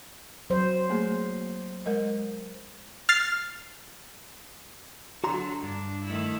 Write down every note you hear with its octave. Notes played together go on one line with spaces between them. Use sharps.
F#3 C5
A3 A#3 G#4
G#3 A#4 D#5
F6 A6 C7
D3 F#3 F#4 A#5 C6
G2 D4
D#3 A3 E4